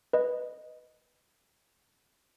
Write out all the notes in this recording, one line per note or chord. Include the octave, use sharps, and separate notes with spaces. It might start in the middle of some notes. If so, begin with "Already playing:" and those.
B4 D#5